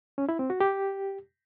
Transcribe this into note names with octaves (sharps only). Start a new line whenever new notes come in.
C#4
E4
C4
F#4
G4